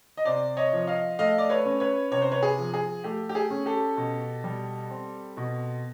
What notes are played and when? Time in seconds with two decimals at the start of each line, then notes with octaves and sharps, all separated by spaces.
0.17 D#5
0.25 C3 C5 D5
0.57 C#5 D#5
0.73 F3
0.87 D#5 F5
1.19 A3 D#5 F5
1.38 D5
1.50 B4 C#5
1.65 C#4
1.80 B4 C#5
2.12 C3 C#5
2.22 C5
2.32 B4 C#5
2.43 G#4
2.58 F3
2.74 G#4
3.04 A3 G4
3.29 G4
3.35 G#4
3.50 C#4
3.66 G4 A4
3.97 B2
4.44 G3
4.90 C4
5.37 B2